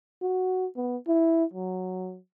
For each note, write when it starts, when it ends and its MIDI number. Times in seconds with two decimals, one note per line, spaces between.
0.22 0.66 66
0.76 0.97 59
1.08 1.44 64
1.54 2.18 54